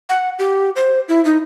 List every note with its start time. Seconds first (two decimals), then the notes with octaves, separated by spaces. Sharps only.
0.09 F#5
0.39 G4
0.76 C5
1.09 E4
1.25 D#4